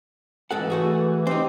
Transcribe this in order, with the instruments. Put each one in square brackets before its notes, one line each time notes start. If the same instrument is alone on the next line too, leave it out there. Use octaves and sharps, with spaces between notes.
[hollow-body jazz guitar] G#2 A4 F#5 [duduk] E3
[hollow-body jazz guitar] A3 F#4 G#4
[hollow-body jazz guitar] C4 D#4 [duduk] G4